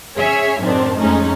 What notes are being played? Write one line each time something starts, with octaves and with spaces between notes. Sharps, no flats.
C#4 G#4 C#5 E5 G#5
F#2 A2 D#3 C4 D4
F2 A2 G#3 A3 C#4 D#4